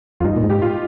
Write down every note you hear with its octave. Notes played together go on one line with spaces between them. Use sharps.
F2 F4
G2 D#4
A#2
G#2
G4
F4